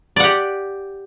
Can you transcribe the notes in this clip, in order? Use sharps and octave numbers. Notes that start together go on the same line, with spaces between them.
G4 D5 F#5